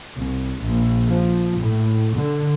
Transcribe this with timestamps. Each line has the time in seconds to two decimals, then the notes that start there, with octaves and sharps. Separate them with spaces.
0.16 C2
0.63 A#1
1.09 F3
1.61 A2
2.17 D3